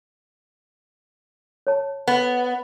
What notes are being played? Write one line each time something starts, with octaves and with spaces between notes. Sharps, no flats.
C#5 A5
B3